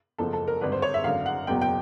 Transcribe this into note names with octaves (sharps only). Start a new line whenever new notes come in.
F#1 E2 C#3 F3 A4
A4
A#4
G#1 G2 D3 B4
C5
C#5
E5
G#1 F#2 D3 F5
F#5
F#1 E2 B2 F#3 G5
G5